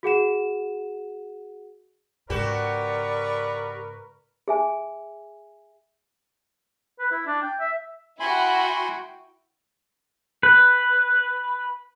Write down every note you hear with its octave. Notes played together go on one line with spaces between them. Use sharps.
F#4 G#4 F#5 E7
G#2 C#3 F#4 G4 A#4 B4 D5 C#6
G#4 E5 G#5
B4
E4
D4
G5
E5
E4 F#4 G5 G#5 B5 C6
B4